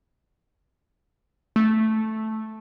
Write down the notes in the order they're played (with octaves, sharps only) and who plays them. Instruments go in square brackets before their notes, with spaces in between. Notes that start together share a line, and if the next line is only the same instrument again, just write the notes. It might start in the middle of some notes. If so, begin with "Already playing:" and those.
[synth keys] A3